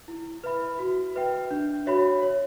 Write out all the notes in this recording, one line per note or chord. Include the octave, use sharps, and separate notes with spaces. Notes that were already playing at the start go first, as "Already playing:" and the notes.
E4
B4 E5 B5
F#4
B4 E5 G5
D4
F#4 C#5 E5 B5
C#5